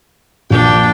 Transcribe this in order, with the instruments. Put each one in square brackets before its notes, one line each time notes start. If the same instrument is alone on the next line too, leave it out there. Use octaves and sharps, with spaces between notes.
[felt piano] A#1 [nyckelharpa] D4 G5